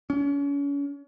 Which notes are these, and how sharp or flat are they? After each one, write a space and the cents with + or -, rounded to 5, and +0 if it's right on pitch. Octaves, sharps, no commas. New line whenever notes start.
C#4 +35